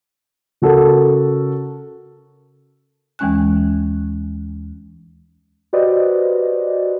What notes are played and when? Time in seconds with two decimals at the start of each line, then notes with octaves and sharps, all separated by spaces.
0.62 C#3 F#4 A4 A#4
3.19 D#2 E3 G#3 C#4 G#5 F#6
5.73 F#4 G4 B4 C5 D5 D#5